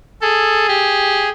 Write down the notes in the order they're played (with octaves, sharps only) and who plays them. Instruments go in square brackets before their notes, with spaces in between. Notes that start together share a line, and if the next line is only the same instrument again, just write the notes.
[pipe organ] G#4 [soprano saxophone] A4
[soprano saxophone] G4